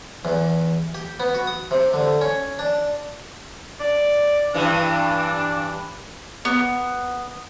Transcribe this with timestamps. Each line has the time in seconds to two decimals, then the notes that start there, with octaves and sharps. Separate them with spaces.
0.25 E2
0.95 G4
1.20 B3
1.35 F#4
1.47 D#6
1.71 C3
1.94 D3
2.21 C#4
2.59 D4
3.80 D5
4.54 G2 E3 D4
6.45 B3